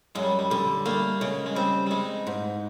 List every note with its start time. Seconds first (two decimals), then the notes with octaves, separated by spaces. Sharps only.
0.15 F#2 G#3
0.23 G3
0.39 G3
0.50 D3 G3
0.86 G3 A3 A#3
1.21 C#3 G#3
1.46 G#3
1.56 G3 C4
1.87 G3
1.91 G#3 D#4
2.27 G#2